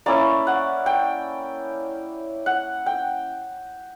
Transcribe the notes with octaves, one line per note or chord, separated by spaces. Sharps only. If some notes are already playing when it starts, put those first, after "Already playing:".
A#3 C#4 E4 D5
F#5
G5
F#5
G5